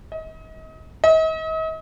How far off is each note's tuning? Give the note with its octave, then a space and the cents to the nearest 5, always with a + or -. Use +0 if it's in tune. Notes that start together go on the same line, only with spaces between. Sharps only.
D#5 +35
D#5 +45